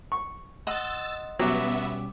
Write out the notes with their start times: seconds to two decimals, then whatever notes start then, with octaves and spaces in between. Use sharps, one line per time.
0.12 C#6
0.67 D#5 F#5 C6 E6 A6
1.39 B2 F#3 G3 B3 C#4 G4 E5